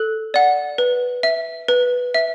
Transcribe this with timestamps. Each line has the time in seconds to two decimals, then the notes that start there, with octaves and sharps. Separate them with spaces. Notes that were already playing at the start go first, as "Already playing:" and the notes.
Already playing: A4 F#6
0.34 D5 F#5
0.78 B4
1.23 E5
1.68 B4
2.14 E5